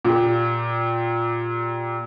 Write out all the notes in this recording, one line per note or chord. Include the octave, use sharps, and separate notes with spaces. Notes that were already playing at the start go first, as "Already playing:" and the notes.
A#2 G4